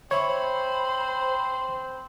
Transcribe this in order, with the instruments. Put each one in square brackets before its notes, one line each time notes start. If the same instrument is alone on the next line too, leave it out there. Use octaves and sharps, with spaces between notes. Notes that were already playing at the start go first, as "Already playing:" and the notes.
[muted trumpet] C4 [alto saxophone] C5 [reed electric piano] C#5 E5 C#6 [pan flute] B5